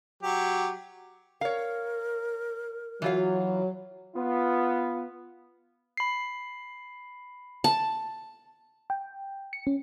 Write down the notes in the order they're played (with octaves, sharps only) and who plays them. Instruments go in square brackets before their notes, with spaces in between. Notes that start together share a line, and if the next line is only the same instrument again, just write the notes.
[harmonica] F#3 G4
[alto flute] A#4 [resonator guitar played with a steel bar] C#5 F5
[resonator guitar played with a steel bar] E3 F4 F5 [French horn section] F#3
[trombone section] B3 F4
[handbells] B5 C7
[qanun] A5
[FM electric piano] G5
C#7
C#4